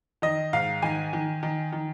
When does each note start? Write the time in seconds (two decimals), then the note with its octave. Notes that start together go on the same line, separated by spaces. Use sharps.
0.22 D#3 D#5
0.53 G#2 F5
0.82 D#3 G#5
1.13 D#3
1.43 D#3
1.72 D#3